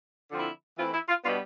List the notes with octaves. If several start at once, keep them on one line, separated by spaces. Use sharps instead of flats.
D3 F3 C4 E4
E3 A3 C4 E4 F4
E4
F4
B2 G3 B3 D4 F4